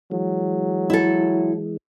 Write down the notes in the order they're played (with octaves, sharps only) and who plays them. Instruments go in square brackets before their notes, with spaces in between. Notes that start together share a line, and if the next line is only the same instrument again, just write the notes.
[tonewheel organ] E3 G#3 [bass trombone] F#3
[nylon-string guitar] E4 A4